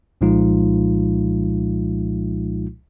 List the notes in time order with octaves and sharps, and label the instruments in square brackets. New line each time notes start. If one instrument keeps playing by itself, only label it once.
[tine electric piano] C2 A#2 F3 G#3 D#4 F4